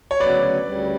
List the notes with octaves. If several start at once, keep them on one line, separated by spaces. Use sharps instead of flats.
C#5
D2 C#3 F#3 B3 B4 D5
D2 C#3 G3